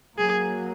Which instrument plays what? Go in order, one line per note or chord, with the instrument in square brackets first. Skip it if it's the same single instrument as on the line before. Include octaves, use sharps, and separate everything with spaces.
[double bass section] F#3 A#3 [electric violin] G#4